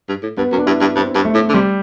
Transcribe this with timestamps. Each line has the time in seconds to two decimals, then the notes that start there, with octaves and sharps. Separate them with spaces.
0.09 G2
0.23 A2
0.37 G2 B3
0.52 F#2
0.58 D4
0.66 G2 E4
0.81 G2
0.96 G2 C4
1.15 G2
1.25 A3
1.34 A2
1.49 D3
1.54 C3 G3